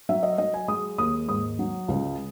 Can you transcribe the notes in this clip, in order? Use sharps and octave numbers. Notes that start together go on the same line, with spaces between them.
F#3 E5
D#5
F#3 D#5
G#5
G#3 D#6
D#2 D#6
G#2 D#6
F#3
C#2